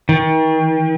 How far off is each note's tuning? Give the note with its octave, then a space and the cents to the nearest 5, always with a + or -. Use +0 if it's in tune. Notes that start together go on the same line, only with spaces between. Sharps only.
D#3 +35